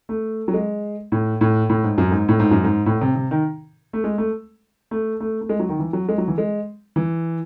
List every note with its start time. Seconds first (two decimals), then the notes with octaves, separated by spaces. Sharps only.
0.09 A3
0.48 F#3
0.54 G#3
1.12 A2
1.41 A2
1.69 A2
1.84 G#2
1.98 F#2
2.11 G#2
2.29 A2
2.39 G#2
2.51 F#2
2.64 G#2
2.86 A2
3.01 C3
3.15 C3
3.31 D#3
3.93 A3
4.04 G#3
4.18 A3
4.91 A3
5.20 A3
5.41 A3
5.49 G#3
5.60 F#3
5.69 D#3
5.79 E3
5.93 F#3
6.09 G#3
6.18 F#3
6.28 E3
6.38 G#3
6.96 E3